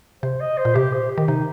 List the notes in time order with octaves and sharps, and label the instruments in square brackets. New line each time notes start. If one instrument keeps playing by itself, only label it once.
[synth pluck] C3 [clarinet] C5
[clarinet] D#5
C5
[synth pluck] A#2
[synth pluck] C3 [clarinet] G4
[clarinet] C5
G4
[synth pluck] D#3
[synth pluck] C3 [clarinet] D#4